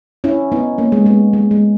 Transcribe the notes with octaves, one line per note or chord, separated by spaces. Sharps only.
C#4 E4
B3 D#4
A#3 C#4
G#3 B3
G#3 B3
G#3
G#3